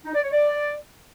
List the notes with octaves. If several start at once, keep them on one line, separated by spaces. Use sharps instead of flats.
D#4
D5
C#5
D5